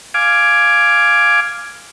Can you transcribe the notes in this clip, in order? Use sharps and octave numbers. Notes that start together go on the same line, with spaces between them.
F5 G#5 D6